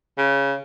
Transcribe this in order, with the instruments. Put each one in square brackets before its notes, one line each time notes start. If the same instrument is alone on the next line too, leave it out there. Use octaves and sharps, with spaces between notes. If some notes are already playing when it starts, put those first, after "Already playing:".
[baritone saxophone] C#3